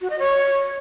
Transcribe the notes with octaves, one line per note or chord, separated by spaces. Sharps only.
F#4
D#5
C#5